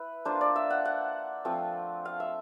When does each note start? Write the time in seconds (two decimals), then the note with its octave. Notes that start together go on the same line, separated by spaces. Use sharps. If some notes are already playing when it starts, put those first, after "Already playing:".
Already playing: E4 B4
0.25 A#3 D4 F4 C5
0.41 D5
0.56 E5
0.70 F#5
0.85 F#5
1.45 F3 A3 C4 F4
2.05 F5
2.20 E5